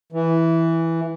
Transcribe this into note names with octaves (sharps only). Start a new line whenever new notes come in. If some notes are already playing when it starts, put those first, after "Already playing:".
E3